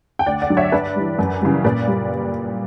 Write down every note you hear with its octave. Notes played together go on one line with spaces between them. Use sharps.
G5
D2 D5 F#5
D5 F#5
D3 F#3
C#5 E5
G2 B4 D5
E3 G3
F#2
C#3 E3 G3
A#2 B4 D5
G3